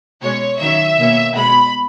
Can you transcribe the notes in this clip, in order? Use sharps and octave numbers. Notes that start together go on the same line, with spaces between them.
B2 G#3 C#4 C#5
D#3 F#3 C#4 E5
B2 A#3 C#4
B2 G#3 B3 B5